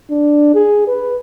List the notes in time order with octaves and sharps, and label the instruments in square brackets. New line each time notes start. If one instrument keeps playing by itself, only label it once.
[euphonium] D4
G#4
B4